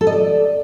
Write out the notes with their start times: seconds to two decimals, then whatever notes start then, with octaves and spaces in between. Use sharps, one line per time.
0.01 A4
0.07 D#5
0.13 D5